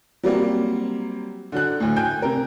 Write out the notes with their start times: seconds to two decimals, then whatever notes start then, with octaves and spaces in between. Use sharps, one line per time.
0.23 F#3 G3 A#3 C4
1.52 D3 F#3 F#6
1.80 D2 A2
1.96 G5 G#5 G6
2.22 C3 A#4